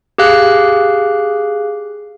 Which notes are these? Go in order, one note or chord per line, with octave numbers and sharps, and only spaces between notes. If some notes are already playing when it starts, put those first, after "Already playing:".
G4 G#4 F5 F#6